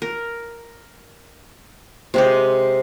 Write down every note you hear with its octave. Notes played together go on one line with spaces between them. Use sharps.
A#4
C3 G#3 G4